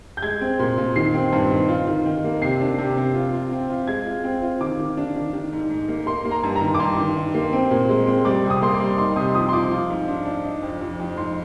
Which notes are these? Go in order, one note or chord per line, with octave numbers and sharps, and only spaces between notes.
G6
G#3 G#6
C4
A#2
A#2
D#3 C7
C4
G2
D#3
F4
D#3
D#3
A#3
C3 C7
D4
C3
C3
F4
F4
C4
F4
G#3 G#6
F4
C4
F4
D#3 D6
D#3
D4
D#3
D#3
G#2
G#2
A#3
A#3 C6
A#3
A#5
G2
A#5
D#3
D6
G2 C6
D#3
D#3
A#3
C4
A#2
G#3
C4
G3 D6
C3
D#6
A#3 C6
D6
G3
D#4 C6
C3 D#6
F3 D#6
C6
F3 D6
F4
G#2
D4
D4
D#4
F2
F2
F2
G#2 C6